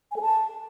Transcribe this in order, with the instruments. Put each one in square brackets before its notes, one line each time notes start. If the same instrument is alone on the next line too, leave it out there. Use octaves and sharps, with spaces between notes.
[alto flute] G#5
A4
A5